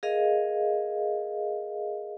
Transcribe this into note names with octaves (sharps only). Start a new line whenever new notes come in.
G#4 A#4 D#5 F5